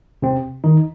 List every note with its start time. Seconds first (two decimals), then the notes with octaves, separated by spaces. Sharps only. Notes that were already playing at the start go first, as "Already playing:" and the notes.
0.22 C3 C4
0.64 D#3 D#4